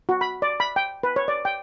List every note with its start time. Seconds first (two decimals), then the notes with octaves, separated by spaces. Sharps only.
0.09 F#4
0.21 B5
0.42 D5
0.60 B5
0.76 G5
1.03 B4
1.16 C#5
1.28 D5
1.45 G5